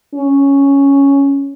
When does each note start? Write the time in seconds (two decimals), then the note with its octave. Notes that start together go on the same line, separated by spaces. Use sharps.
0.15 C#4